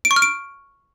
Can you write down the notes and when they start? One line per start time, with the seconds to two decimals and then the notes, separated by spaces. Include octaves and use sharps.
0.05 D7
0.11 C#6
0.16 F6
0.22 D7